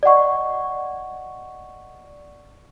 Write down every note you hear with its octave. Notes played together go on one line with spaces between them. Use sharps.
D5 D#5 F#5 C#6